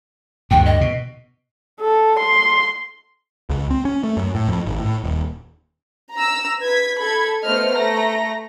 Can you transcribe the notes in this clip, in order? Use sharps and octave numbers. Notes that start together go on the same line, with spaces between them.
D2 G2 G5
D#5
B2
A4
C6
C#2
C4
C#4
A3
F#2
A2
F2
G#1
A2
D#1
A#5 E6
B4 G#6 B6
A4 B5 G#6
A3 B3 C5 D#5 F6
A3 A#5 A#6